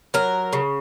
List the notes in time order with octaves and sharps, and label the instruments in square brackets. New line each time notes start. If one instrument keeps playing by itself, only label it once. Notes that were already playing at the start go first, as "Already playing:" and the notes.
[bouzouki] F#3 A#4
C#3